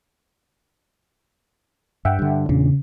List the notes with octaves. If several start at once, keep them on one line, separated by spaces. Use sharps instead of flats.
G2 E5 F#5 G5
G2 D3
E2 A#2 C#3 D4